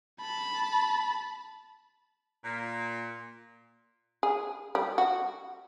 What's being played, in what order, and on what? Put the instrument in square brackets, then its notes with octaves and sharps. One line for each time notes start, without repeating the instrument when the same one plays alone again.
[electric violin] A5 B5
[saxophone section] A#2
[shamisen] G#4
G3
F#4